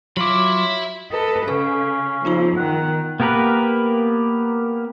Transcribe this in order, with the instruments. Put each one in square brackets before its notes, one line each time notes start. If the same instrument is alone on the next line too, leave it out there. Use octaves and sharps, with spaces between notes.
[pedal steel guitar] F#3 D6 [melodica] F4 [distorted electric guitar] E5 B5
[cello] A4 B4 [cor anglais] D#5
[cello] C#3 [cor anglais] C#4 [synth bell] A4
[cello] F3 [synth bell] B3 D#4 F4
[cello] D#3 [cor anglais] F#5
[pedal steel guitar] A#3 B3 G4 A#4 B4